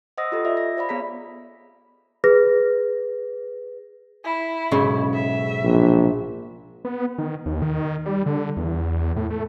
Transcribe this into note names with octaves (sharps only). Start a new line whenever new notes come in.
C5 D#5 F#5 D#6 E6 A#6
F4 G4 A4 D#5
F4 D5 E5
A#6
C5 D5 F5 B5
B3 G#4 C#5 A#5 B6
G#4 B4 A#6
E4
B1 G#2 C#3
E5
A#1
B3
D#3
D#2
D#3
G3
D3
E2
A2
A3